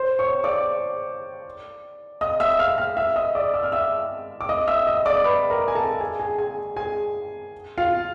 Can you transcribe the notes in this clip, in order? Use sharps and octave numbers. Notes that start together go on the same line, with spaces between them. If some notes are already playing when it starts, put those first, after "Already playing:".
Already playing: C5 C6
C#5 C#6
D5 D6
D#5 D#6
E5 E6
F5 F6
F5 F6
E5 E6
D#5 D#6
D5 D6
E6
F6
E5 E6
D6
D#5 D#6
E5 E6
D#5 D#6
D5 D6
B4 B5
A#4 A#5
G#5
A4 A5
G#4 G#5
G#4 G#5
G#4 G#5
G#4 G#5
F4 F5